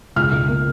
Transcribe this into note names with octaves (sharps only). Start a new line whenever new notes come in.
C#2 F6
C#2
A#3